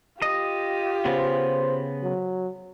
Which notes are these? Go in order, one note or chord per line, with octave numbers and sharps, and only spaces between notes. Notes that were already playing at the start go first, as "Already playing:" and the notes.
F4 G4 D#5
C#3 B3 C5
F#3